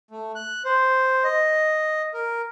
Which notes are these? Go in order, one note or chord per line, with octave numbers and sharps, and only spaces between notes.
A3
F#6
C5
D#5
A#4